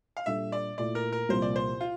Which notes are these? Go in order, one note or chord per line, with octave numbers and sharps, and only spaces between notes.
F5
A#2 G3 D4 A4 E5
D5
A#2 A3 E4 D5
A#4
A#4
C2 A#2 F3 A#3 F4 C5
D5
C5
F4